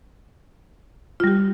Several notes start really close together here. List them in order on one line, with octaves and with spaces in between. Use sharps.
F4 G3 G4